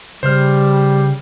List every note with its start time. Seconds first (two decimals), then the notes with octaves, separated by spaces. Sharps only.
0.23 C#3 G3 C5 F6